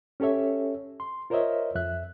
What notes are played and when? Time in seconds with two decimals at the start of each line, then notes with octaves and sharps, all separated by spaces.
0.20 C#4 G4 A4 C#5 E5
1.00 C6
1.30 F4 A#4 C5 C#5 D#5 E5
1.75 F2 E5 F#6